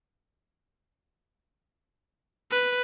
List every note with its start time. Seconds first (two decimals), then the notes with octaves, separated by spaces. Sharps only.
2.51 B4